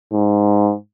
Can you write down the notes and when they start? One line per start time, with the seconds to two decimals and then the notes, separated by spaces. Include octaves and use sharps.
0.13 G#2